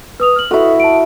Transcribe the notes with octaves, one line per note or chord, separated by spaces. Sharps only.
B4 D#6 F7
F6 F#7
E4 F#4 A4
A5 D7